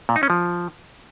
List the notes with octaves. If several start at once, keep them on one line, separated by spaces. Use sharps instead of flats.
A#2
D#4
C#4
F3